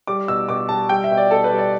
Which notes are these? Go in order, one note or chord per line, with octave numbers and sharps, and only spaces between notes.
G3 D6
B2 E6
B2 D6
G3 A5
G3 G5
E5
B2
D5
B2 A4
B4
G3
D5